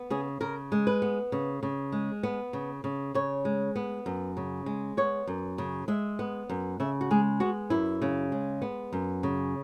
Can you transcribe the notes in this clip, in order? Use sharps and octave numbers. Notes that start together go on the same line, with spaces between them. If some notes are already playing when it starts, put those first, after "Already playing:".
Already playing: B3
C#3 G#4
C#3 A#4
G#3
B4
B3
C#3
C#3
G#3
B3
C#3
C#3
C#3 C#5
G#3
B3
F#2
C#3
G#3
B3 C#5
F#2
C#3
G#3 E5
B3
F#2
C#3 E5
F#4
G#3 G#4
B3 F#4
F#2 E4
C#3
G#3
B3
F#2
C#3